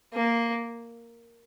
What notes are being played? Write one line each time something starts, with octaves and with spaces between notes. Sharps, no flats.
A#3